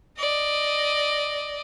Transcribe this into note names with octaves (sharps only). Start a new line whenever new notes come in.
D5 D#5